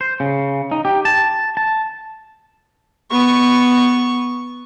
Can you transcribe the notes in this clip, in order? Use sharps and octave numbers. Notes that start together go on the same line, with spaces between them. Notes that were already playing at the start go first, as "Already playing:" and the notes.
C5
C#3
D#4
G4
A5
A5
B3 C#6